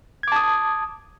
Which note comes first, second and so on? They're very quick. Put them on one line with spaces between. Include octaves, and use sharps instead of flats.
G#6 D6 A5 D#6